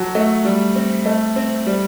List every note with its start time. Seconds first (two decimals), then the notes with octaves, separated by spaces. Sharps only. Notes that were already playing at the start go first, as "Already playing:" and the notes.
Already playing: F#3 A4
0.15 A3
0.45 G3
0.75 C4
1.06 A3
1.36 C4
1.66 G3